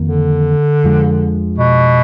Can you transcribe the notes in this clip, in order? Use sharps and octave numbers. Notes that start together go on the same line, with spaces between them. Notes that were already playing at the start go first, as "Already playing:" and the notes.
Already playing: F2 D#3 A#3
D3
F2 F3 G#3 D4
B2